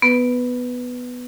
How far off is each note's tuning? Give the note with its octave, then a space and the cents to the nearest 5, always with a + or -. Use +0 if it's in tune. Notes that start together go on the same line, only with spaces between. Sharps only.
B3 +0 B4 +0